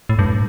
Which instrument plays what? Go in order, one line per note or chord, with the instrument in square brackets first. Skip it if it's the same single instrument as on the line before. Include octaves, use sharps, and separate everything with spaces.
[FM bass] A2
G2
A2